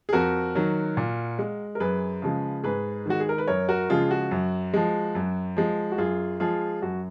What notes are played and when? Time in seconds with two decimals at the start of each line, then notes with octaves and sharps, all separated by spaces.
0.09 G#4
0.13 F2 F#4 A#4
0.55 D#3 F#3
0.97 A#2
1.39 G#3
1.75 A#4
1.80 F#2 G#4 B4
2.22 C#3 F3 G#3
2.64 G#2 G#4 B4
3.06 D#3 G#3 F#4
3.20 G#4
3.29 A#4
3.38 B4
3.48 F#2 A#4 C#5
3.68 F#4 A#4
3.90 C#3 F3 G#3 F4 G#4
4.11 F#4
4.31 F#2
4.74 F3 G#3
5.15 F#2
5.57 F3 G#3
5.92 F#4
5.98 F#2 F4 G#4
6.40 F3 G#3 F4 G#4
6.82 F#2 F#4